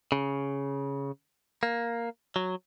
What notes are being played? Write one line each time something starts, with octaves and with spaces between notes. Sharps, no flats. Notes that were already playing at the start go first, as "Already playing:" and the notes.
C#3
A#3
F#3